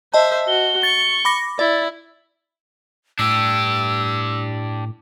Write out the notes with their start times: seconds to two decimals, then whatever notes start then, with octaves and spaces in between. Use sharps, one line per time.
0.14 C5 D#5 E5 A5
0.48 F#4 G7
0.83 C#6 A6
1.25 B5 D6 A#6
1.59 E4 D5 A6
3.19 A2 D4 G4 E6